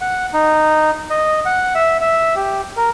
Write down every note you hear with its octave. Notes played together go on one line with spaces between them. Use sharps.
F#5
D#4
D#5
F#5
E5
E5
G4
A#4